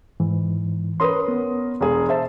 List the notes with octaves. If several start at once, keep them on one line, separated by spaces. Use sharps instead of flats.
G#2 E3
C#4 A#4 B4 C6 D#6
B3
E1 G#4
C5 E5 A5